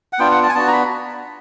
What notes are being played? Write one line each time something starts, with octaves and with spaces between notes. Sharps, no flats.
F#5
B3 D4 F4 G5
F#5
A5
G#5
B3 D4 F#4 A5
A#5
B5